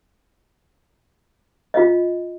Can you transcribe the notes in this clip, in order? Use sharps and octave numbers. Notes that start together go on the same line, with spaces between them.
F4 D#5